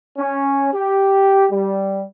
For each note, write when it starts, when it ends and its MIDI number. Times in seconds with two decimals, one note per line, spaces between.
0.18 0.69 61
0.73 1.45 67
1.52 2.03 55